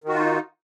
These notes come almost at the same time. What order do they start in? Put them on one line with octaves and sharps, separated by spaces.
D#3 F#4 F4 D#4